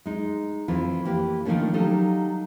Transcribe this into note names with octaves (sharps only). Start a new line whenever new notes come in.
G#3 D#4
F2 E3 F4
E3 A#3 G4
D#3 F3 A3 A#3 C#4 D4
F#3 G3 D#4 A4 F5